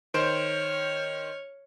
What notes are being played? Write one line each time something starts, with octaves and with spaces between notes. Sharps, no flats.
D#3 C5 C#5 F6 D7